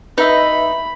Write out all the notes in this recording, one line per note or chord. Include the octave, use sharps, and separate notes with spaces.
D#4 B4 D#5 E5 B5